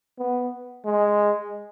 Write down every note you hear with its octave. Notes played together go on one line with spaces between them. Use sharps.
B3
G#3